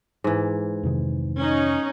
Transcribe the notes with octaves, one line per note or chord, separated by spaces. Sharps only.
G#2 E3
F2 C3 D#3
C#4 D#4